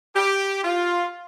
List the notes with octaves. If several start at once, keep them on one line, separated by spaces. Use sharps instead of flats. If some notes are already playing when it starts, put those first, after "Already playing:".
G4
F4